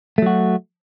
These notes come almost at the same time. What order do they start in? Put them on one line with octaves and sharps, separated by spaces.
A3 F#3 F#4